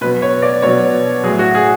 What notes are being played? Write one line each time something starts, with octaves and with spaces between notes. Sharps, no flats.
B2 F#3 B4
C#5
D5
B2 F#3 C#5
A2 F#3 G#4
F#4
G#4